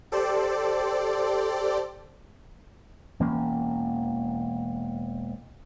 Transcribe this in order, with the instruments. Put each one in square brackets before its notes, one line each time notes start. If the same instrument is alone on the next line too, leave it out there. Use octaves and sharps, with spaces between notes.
[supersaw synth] G4 A4 C5 D5
[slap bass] E1 E3 A#3 C#4